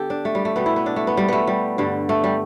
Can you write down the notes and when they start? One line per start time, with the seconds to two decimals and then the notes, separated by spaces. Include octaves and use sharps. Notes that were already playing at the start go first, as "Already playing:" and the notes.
Already playing: D3 B3 G4 A4
0.10 D4
0.25 A3
0.35 G3
0.45 A3
0.56 B2 G3 B3
0.66 E4
0.76 B3
0.86 D4
0.96 A3
1.07 B3
1.17 G3
1.28 A3 B3
1.47 G3
1.78 G2 D3 G3
2.09 A3
2.24 G3